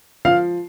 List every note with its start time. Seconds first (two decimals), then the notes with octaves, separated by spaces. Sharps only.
0.25 F3 F5